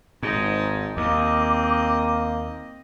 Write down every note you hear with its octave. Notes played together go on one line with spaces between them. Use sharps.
G#1 G#2 D#4
D#2 A#3 C4 D#5 D6